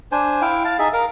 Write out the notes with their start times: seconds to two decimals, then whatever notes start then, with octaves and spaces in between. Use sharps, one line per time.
0.12 D4 C5 G#5
0.42 E4 F5 G5
0.65 F5 A5
0.79 D#4 G#4 E5
0.93 A#4 F5